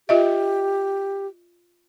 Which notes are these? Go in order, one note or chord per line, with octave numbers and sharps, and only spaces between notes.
F4 G4 D#5 E5